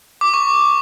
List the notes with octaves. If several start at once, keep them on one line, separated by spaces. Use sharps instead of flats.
D6
C#6